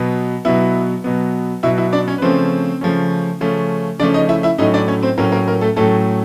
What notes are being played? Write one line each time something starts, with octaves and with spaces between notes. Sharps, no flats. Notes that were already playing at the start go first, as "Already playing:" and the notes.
Already playing: B2 F#3 B3
B2 F#3 B3 E4 E5
B2 F#3 B3
B2 F#3 B3 E4 E5
E4 E5
D4 D5
C#4 C#5
B4
C#3 F3 A3 C4 C#4 C5
C#3 F3 A3 C#4
C#3 F3 A3 C#4
C#3 F3 A3 C#4 D4 D5
D#4 D#5
E4 E5
E4 E5
A2 F#3 A3 C#4 D#4 D#5
D4 D5
C#4 C#5
C4 C5
A2 F#3 A3 A#3 C#4 A#4
A#3 A#4
A#3 A#4
A3 A4
A2 F#3 A3 C#4 A4